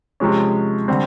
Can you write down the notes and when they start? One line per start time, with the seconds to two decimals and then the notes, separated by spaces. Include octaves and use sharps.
0.20 C3 F3 G#3 C#4
0.88 D3 G3 C4